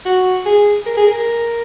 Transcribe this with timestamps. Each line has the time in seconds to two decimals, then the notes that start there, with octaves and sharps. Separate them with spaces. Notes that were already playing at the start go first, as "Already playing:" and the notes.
0.05 F#4
0.45 G#4
0.86 A#4
0.97 G#4
1.06 A#4